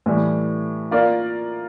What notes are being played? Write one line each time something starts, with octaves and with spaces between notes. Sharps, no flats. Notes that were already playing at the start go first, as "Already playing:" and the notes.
A2 E3 G3
A#3 F4 A#4 D5